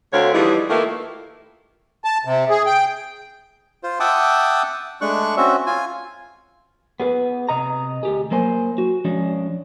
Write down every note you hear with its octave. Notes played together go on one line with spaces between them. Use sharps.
D2 D3 A3 C4 C#5 F5
E3 F3 G3 D#4 E4 G#4
D#3 A3 A#3 E4 F4 B4
A5
C3
G#4
G5
F4 C5
E5 F#5 G5 A5 D6 D#6
G#3 A3 D4 C#6 F#6
C4 C#4 F#4 E5
F4 G#5
B3 G#4 B4
C3 D#5 A#5
D2 G4 G#4
F#3 A#3 C5 G#5
F#4
F3 G#3 C#4 D4